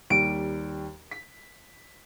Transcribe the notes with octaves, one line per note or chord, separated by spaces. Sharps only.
D#2 G3 D7
B6